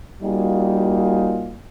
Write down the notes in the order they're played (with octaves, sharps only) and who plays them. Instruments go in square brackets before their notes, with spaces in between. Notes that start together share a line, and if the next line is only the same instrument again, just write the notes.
[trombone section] G3 A#3 D#4 F4 F#4 G#4